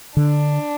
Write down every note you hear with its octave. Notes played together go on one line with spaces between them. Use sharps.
D3 D4